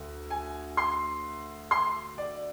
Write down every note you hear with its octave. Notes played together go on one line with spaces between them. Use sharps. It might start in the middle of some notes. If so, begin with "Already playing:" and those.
Already playing: D2
G#5
C6
C6
D5